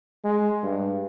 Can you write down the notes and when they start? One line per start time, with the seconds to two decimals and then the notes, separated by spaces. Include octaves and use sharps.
0.24 G#3
0.63 G2